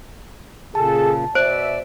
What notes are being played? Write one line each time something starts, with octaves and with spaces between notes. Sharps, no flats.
A#2 C#3 G#4 A4 A5
B2 C5 D5 E5 D7